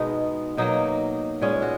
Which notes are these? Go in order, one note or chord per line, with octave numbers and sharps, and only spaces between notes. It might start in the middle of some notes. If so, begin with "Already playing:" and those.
Already playing: B2 G#3 B3 D#4
B2 F#3 A#3 D#4
A#2 G#3 B3 C#4
F#4